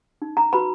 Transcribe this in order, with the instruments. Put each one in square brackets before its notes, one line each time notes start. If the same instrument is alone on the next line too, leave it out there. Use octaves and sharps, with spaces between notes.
[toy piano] D#4
A#5
F#4 B4 B5